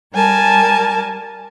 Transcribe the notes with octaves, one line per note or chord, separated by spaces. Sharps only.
G3 A#4 G#5 A5